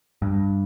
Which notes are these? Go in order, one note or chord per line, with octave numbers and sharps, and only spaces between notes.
G2